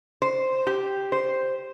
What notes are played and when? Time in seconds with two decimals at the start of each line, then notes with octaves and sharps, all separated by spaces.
0.22 C5
0.67 G4
1.12 C5